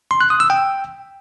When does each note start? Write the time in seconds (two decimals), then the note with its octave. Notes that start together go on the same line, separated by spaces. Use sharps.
0.11 C6
0.21 F#6
0.30 D#6
0.40 E6
0.50 G5